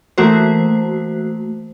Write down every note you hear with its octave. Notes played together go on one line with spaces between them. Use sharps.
E3 A3 A#3 F#4 C5